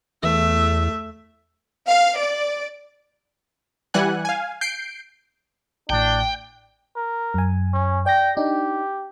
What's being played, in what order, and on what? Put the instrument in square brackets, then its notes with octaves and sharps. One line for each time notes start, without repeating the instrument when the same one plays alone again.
[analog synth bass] E2 [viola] A3 E5
[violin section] F5
D5
[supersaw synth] E3 G3 F#5 G#5 F#6
F5 G#5
G6 C7 D7
[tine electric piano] A1 A2 [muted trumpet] D4 [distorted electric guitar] G5
[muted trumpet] A#4
[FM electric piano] F#2 G#5
[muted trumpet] C#4
[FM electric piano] D5 A#6 [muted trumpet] G5
[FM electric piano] D4 D#4 [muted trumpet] G4